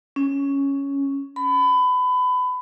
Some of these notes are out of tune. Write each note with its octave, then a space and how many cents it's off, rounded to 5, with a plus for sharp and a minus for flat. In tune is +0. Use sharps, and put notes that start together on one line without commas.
C#4 +0
B5 +25